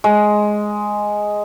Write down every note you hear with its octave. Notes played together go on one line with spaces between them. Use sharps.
G#3